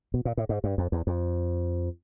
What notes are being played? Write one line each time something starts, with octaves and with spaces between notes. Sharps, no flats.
B2
A#2
A2
G#2
G2
F2
E2
F2